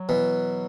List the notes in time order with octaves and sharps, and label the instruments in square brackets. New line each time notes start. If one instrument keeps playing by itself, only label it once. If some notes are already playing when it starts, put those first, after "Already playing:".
Already playing: [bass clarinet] F#3
[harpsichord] B2 E3